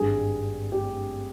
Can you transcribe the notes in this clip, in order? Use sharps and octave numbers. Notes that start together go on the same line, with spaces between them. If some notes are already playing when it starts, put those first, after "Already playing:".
Already playing: G#1 G2 G3 G#4
G4